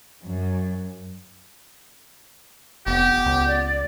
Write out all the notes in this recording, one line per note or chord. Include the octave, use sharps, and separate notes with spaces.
F#2
F1 B3 G4
C#2
D5